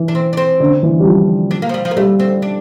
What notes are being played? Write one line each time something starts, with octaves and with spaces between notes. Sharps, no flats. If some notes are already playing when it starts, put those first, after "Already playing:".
Already playing: E3
D4
C4
D4
C4
D3
E3
G3
F3
D4
A#3
F3
G3
F3
A#3
G3 A3
C4
D4